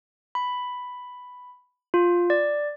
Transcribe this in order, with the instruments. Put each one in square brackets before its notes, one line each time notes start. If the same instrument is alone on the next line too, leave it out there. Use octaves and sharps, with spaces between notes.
[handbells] B5
F4
D5